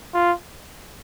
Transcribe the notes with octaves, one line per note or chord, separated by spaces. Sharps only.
F4